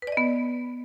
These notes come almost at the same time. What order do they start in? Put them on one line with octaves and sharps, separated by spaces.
B4 D5 D#5 B3